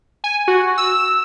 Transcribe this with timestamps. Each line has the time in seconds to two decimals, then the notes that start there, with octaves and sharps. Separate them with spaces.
0.24 G#5
0.48 F#4
0.78 E6